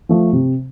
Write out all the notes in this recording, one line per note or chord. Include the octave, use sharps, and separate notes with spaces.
F3 A3
C3